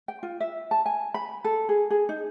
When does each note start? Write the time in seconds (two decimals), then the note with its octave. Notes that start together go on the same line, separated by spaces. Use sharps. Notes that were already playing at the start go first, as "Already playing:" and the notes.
0.08 G5
0.23 F4
0.40 E5
0.71 A5
0.86 G#5
1.14 B5
1.45 A4
1.69 G#4
1.90 G#4
2.09 D#4